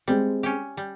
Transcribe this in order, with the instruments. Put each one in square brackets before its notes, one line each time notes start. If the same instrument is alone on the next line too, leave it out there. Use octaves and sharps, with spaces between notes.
[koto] G3 [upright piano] G#3 C4
[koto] C#4 G4
G3